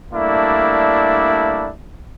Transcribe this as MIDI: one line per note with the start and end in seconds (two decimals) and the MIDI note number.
0.12 1.70 55
0.12 1.70 57
0.12 1.70 58
0.12 1.70 62
0.12 1.70 64